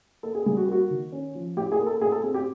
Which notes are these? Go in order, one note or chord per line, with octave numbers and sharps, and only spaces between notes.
A#3 A4
G#4
G3 G#4
F#4
G4
A#3 F#4
D#3
C#4
F3
A2 G4
G#4
A#3
A4
A2 G#4
A4
C4 G#4
G4